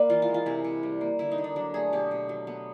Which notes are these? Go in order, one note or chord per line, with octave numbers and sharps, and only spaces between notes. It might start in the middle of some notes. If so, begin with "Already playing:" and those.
Already playing: A#3 B4 D5
E3 F4
F4
G#3
F4
C3 E4
C3
G3
A#3
D3 E4
D#4
D3
D4
F#3 D4
A3 G#4
B2 G4
B2
F#3
B3